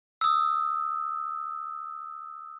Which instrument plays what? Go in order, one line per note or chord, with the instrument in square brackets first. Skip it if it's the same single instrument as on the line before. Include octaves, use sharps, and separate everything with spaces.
[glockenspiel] D#6 E6